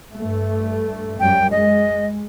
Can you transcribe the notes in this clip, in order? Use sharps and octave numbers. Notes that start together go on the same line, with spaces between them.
G2 A3
F#2 G3 G5
G#3 D#5